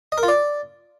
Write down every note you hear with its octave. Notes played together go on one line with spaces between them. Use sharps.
D#5
A#4
F4
D5